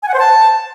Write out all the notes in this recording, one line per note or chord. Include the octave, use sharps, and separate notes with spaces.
G#5
F#5
C5
A5